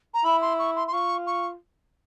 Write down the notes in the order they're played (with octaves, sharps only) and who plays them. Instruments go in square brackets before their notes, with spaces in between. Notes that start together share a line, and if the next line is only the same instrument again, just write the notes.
[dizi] A#5
[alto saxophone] E4 [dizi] B5
[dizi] C6
C#6
C6
C6
[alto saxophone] F4 [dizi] C#6
[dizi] C#6